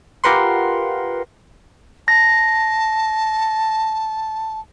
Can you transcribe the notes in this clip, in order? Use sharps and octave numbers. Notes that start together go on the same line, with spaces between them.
F4 G4 A#4 B4 F#5 C6
A5 A#6